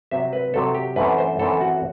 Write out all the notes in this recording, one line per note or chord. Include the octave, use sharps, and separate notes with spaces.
C3 F#3 C4 E5
B4
C3 F#3 C4 A4
G4
F#2 E3 A3 C4 B4
C5
F#2 E3 A3 C4 A4
F#4